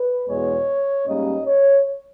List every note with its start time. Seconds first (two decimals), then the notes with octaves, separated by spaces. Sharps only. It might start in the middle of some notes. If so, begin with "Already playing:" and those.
Already playing: B4
0.28 E2 B2 G#3 B3 C#5
1.07 G#2 G3 A#3 C#4 D#5
1.45 C#5